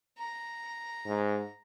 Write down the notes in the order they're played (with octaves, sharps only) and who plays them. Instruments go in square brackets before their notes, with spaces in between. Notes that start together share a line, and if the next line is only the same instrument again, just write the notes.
[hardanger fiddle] A#5
[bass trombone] G#2